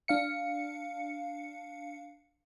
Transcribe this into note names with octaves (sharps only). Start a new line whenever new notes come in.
D4 F5 C#7